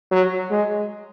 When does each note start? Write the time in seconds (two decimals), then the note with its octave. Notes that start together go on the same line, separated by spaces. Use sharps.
0.11 F#3
0.51 G#3